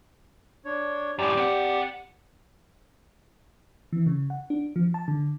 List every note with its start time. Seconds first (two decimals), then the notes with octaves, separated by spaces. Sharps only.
0.65 D4 C#5
1.19 F#2 A2 G4 D5
1.37 C4 F#5
3.93 E3
4.06 C#3
4.30 F#5
4.50 D4
4.76 F3
4.94 A5
5.08 D3